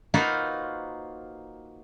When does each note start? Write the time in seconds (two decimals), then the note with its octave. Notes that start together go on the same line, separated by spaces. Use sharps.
0.14 A#3 D#4 F4 F#4 B4 C5